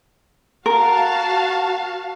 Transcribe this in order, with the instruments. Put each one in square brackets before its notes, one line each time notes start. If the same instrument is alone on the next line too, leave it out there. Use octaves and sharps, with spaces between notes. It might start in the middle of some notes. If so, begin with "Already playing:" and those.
[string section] F#4 F5 A5 [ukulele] A#4